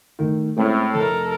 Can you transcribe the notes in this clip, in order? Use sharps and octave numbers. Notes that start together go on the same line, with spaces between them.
A2 D#3
A2 G#3 C4 C#4
F1 A4 A#4